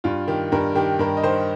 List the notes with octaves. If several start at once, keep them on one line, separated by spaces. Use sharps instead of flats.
G2 F4
D#3 G4
G2 A#4
D#3 G4
G2 A#4
D#5
D#3 C5